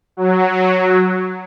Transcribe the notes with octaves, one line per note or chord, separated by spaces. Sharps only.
F#3